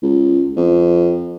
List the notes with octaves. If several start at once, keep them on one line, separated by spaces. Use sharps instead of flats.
C#2
F2